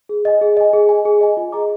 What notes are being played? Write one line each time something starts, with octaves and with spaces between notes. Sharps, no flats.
G#4
D#5 G#5
G#4
D#5 G#5
G#4
D#5 G#5
G#4
D#5 G#5
F4
G#4 D#5 A#5 D6